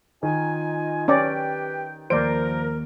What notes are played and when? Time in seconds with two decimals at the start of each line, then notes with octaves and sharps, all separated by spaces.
0.23 D#3 D#4 F4 G#5
1.08 C#4 G4 B4 D5 G5
2.10 D#2 F3 A#4 C5 D5 G6 D7